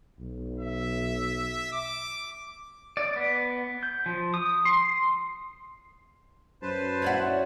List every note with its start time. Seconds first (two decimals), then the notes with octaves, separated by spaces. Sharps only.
0.20 B1
0.60 E5
1.73 D6
2.97 D5
3.16 B3
3.83 G6
4.06 F3
4.34 D#6
4.65 C6
6.62 F#2 B4 C5 A5
7.02 C#4 E4 F#4 D5